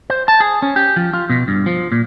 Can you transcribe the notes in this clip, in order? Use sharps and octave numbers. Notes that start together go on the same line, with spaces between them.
C5
A5
G#4
C#4
G4
F3
F4
B2
G2
F3
A#2